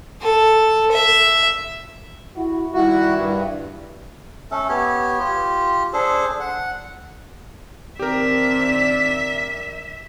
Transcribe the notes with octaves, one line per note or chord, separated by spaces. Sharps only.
A4
E5
E4 F#4
D#3 G3 E4 F#4
G2
A3 C#4 A4
B3 G4 C#5
F4 G4
D4 G#4 A4 C5
F#5
D#3 C4 D4 G4 A#4 D5 E5